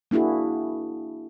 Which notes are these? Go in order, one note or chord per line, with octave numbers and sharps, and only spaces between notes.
A#3 D4 E4 F#4 G#4